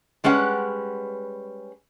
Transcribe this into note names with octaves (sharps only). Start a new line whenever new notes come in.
G3 G#3 C#4 B4 F#5